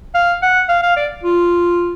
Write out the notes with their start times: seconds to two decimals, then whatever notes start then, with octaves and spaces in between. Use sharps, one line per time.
0.15 F5
0.42 F#5
0.69 F5
0.83 F5
0.97 D5
1.23 F4